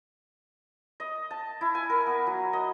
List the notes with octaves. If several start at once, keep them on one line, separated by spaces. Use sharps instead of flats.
D#5
A5
E4
G#5
A#4
B3
F#3
D#5